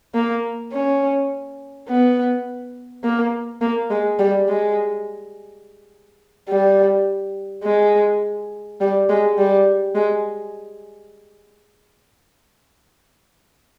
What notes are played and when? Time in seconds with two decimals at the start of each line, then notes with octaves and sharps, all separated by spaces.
0.14 A#3
0.72 C#4
1.88 B3
3.04 A#3
3.61 A#3
3.90 G#3
4.19 G3
4.48 G#3
6.49 G3
7.64 G#3
8.81 G3
9.09 G#3
9.38 G3
9.95 G#3